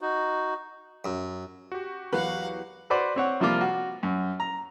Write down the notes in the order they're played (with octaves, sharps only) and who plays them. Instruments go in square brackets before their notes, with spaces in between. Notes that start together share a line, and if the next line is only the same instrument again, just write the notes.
[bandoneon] D#4 F#4
[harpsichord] F#2
[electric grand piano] F#4 G4
[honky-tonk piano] E2 F#3 [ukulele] B4 [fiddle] F5 F#5
[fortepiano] F#4 B4 C5 D5 F#5
C4 C#5 F#5
C3 F3 G3 A#3 F4 D6
F#4
F#2
A#5